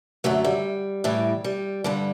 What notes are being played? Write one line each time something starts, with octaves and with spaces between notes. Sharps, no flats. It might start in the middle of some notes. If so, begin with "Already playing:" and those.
F#2 D3 F#3 A3
G3
A2 E3 G3
G3
G2 D3 G3